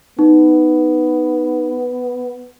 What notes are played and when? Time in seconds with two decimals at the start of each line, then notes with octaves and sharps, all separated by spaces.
0.19 B3 D#4